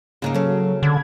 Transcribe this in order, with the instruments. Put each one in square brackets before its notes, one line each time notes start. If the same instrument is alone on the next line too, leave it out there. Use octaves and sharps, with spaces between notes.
[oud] G#2 D4 D#4 [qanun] C#3 A#3
[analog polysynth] F#3 [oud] C#4 A4
[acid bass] D3 [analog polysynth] B5 G#6